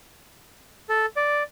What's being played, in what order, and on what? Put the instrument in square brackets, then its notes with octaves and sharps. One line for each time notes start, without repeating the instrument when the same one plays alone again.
[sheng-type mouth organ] A4
D5